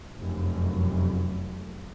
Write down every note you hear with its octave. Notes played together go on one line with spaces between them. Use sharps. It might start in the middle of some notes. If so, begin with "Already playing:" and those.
F1 F#2